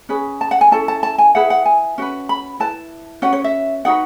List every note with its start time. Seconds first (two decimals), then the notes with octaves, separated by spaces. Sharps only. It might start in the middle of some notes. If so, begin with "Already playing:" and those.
0.09 C#4 G#4 B4
0.41 A5
0.51 F#5
0.61 G#5
0.71 C#4 E4 A4 A5
0.88 A5
1.03 A5
1.18 G#5
1.35 E4 G#4 B4 F#5
1.50 F#5
1.65 G#5
1.98 C#4 F#4 B4
2.29 B5
2.60 E4 B4 A5
3.22 C#4 F#4 B4 F#5
3.33 C#5
3.44 E5
3.85 D#4 F#4 B4 F#5